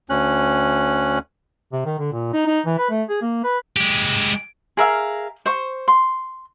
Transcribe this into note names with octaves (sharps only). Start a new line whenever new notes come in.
D2 C#4 F#6
C3
D#3
D3
A#2
D#4
D#4
E3
B4
A3
G#4
A#3
B4
G#3 G4
G#4 A#4 E5 F5
C5 C#6
C6